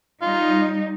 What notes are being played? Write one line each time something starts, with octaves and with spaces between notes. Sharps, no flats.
G3 D#4 F4